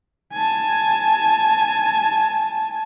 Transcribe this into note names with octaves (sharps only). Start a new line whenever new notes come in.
G#5 A5